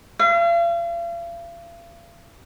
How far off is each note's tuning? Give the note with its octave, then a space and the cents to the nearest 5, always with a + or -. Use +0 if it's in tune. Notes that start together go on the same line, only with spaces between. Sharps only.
F5 -40